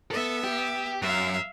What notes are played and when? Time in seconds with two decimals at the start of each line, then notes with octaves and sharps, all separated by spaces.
0.11 B3 A4 E5
0.44 G4
1.02 F#2 E5 F5